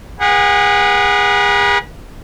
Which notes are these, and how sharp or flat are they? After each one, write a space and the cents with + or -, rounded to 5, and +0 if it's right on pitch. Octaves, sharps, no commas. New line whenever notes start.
G#4 -30 B4 -40 F#5 +0